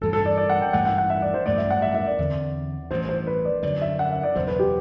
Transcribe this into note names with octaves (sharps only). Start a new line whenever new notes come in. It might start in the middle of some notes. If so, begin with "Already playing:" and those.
A1 G2 E3 A4
A4
D5
D5
F#5
G5
A1 G2 E3 A3 F#5
F#5
F#5
E5
D5
C5
A1 G2 F#3 A3 D5
E5
F#5
E5
E5
D5
E2 D3 A3 C4
A1 G2 E3 C5
C5
B4
D5
F#2 D3 F#3 D5
E5
F#5
E5
D5
F#1 E2 B2 F#3 C5
B4
G4